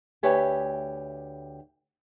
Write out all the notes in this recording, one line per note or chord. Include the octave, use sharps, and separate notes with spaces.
D2 G4 B4 C#5 E5 G#5